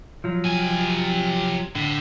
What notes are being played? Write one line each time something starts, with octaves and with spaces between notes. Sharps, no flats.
F3 F#3
C3 G#5
A2 D3